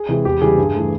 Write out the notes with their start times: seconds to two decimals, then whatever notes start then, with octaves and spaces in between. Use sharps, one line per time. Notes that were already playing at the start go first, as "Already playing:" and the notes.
Already playing: G#4
0.09 C3 E3 G#3
0.25 E2 G4
0.41 C#3 E3 G3 G#4
0.58 G2
0.75 E3 A3